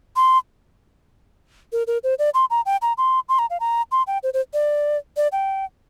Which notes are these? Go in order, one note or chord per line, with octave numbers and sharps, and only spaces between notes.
C6
A#4
A#4
C5
D5
C6
A#5
G5
A#5
C6
C6
A#5
F5
A#5
C6
G5
C5
C5
D5
D5
G5